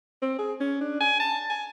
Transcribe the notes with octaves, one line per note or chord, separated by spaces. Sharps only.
C4
G#4
C#4
D4
G#5
A5
G#5